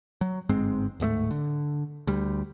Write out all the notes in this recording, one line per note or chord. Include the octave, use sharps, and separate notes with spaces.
F#3
G1 G#2 G#3 C4
D1 G#2 G#3 A3
D3
D2 G3